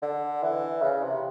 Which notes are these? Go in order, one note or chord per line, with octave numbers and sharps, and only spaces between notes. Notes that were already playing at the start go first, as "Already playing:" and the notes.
D3
E3
C#3
C3